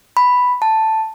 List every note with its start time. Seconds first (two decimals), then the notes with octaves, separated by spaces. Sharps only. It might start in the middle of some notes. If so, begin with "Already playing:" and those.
0.17 B5
0.62 A5